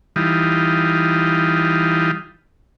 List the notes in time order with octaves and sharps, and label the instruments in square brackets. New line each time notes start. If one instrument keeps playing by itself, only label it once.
[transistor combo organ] E3 G3 D#4 F4